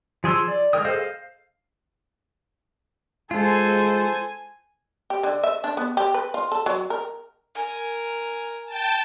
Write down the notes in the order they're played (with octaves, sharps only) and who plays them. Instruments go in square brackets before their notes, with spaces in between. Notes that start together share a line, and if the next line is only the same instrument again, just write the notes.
[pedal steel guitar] F3 G#4 C6 E6
D5
G#3 A#4 G5 D#6
G#4 A4 C5 D#5 F5
F5
[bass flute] G#3 [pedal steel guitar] F4 [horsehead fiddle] A4 C5 [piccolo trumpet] G#5
[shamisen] G4
D3
E5
D4
B3
G4
B4
F4
A4
F#3
A#4
[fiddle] A#4 G#5
[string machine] G5 A5